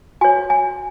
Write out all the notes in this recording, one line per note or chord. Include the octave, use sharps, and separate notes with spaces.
F#4 C#5 G#5
G#5